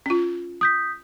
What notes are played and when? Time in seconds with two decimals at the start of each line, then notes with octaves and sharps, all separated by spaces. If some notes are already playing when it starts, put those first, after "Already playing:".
0.06 C#4 F4
0.61 D#6 G6 B6